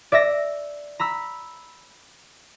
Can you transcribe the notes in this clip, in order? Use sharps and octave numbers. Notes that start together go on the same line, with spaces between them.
D5 E5 E6 A#6
A#5 B5 E6